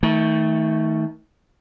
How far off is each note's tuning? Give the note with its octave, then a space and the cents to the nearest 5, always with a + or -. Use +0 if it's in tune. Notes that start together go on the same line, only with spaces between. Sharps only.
D#3 +35 A3 +0